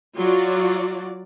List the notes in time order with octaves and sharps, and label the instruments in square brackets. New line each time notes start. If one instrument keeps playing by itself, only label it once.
[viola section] F#3 F4 F#4 D5